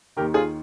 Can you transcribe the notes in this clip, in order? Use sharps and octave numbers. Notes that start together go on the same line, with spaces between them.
D#2 D#3 G4 A#4
F4 G#4